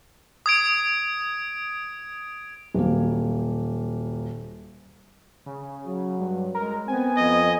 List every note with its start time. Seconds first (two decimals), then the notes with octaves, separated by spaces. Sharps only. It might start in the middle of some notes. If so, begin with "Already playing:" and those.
0.46 D#6 G#6 D7
2.74 D#1 F#3 A#3
5.46 C#3
5.87 F#3
6.20 G2
6.55 G#3 A#4
6.88 B3 C4 G#5
7.18 F2 D#5